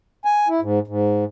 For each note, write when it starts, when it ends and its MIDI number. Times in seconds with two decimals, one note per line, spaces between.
0.25 0.48 80
0.48 0.60 64
0.61 0.79 44
0.87 1.24 44